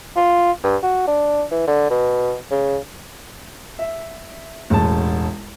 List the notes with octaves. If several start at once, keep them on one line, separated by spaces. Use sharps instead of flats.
F4
G2
F#4
D4
E3
D3
B2
C#3
E5
E1 A1 A5